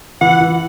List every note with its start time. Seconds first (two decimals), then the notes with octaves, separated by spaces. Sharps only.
0.21 E3 F#5
0.41 E3